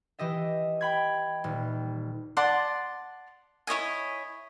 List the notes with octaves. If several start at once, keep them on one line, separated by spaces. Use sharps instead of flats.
E3 G4 D#5 E5
G5 B5 G#6
D#1
D5 F#5 A5 C6
E4 C#5 D#5 G#5